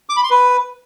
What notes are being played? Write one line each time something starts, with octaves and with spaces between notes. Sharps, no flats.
D6
B5
C6
B4